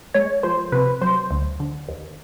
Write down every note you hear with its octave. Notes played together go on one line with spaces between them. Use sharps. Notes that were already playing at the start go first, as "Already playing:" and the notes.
G#3 C#5
F3 C5
C3 B4
F#3 C5
D2
D3
D#2